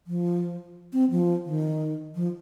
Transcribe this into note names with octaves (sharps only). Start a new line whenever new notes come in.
F3
C4
F3
D#3
F3